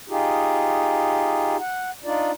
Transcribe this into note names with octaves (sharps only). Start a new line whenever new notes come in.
D#4 F4 G4 G#4
F#5
D4 D#4 F4 D5